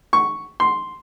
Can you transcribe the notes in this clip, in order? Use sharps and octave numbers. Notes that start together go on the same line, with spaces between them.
C#6
C6